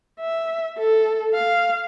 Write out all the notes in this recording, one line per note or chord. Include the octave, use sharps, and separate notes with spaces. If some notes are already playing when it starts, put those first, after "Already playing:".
E5
A4
F5